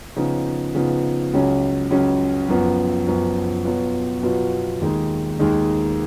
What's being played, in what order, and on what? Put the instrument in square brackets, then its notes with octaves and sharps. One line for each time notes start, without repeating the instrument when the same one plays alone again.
[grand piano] C#3 F3 B3 D#4
C#3 F3 B3 D#4
C#2 C#3 F#3 C#4
C#2 C#3 F#3 C#4
F#2 F3 B3
F#2 F3 B3
B2 F#3 B3 F4
B2 F#3 B3 F4
D#2 D#3 G#3 D#4
D#2 D#3 G#3 D#4